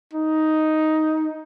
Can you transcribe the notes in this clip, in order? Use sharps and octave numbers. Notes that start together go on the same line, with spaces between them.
D#4